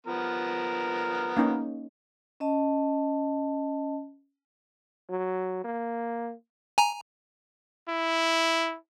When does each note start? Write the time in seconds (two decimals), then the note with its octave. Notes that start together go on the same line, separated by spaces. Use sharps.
0.07 F3 B3 A#4
1.37 A#3 C#4 D#4
2.40 C#4 D#5 A5
5.10 F#3
5.64 A#3
6.78 G#5 A#5
7.88 E4